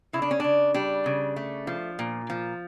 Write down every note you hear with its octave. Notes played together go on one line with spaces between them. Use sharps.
C#3 E4
D4
C#4
C#3 D4
G3 D4
C#3
A3
F3
A#2
F3